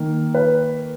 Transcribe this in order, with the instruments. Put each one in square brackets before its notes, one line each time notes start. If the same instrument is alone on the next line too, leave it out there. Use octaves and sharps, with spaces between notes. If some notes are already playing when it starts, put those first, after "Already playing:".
Already playing: [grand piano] D#3 A#3
B4